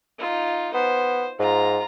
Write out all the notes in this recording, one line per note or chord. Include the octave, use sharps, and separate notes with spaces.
D#4 F4
B3 C5
G#2 F4 A#5